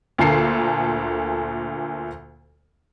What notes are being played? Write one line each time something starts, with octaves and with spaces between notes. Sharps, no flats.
D2 A#2 D3 A#3 A4 C7